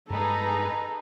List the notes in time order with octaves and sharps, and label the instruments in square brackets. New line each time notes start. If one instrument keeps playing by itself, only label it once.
[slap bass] G2 G#3 [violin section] D#4 G#4 B4 [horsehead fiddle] A4 A#5